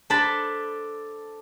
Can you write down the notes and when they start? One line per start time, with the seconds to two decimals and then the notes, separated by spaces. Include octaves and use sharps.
0.10 D4 A4 C5 A5 B5